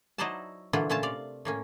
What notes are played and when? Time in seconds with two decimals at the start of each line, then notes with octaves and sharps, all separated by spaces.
0.18 F#3 D#4 E4 C5 D5 A5
0.73 A#2 D3 E3 F#3 E4 F4
0.90 A#2 A3 C#4 F4 F5 A5
1.03 C3 D5 F5
1.45 A2 A#3 C#4